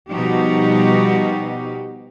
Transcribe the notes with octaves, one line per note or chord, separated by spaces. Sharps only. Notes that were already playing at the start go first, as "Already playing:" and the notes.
B2 F3 G3 D#4 F#4 G4